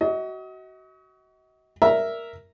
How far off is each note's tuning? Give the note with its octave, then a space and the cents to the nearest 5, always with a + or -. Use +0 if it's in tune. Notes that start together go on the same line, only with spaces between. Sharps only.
F#4 +25 D#5 +40
A#4 +0 E5 +0 A#5 +0